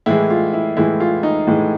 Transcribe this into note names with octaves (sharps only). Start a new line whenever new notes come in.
A2 E3 G#3 E4
F4
E4
A2 E3 G#3 E4
F4
D#4
A2 E3 G#3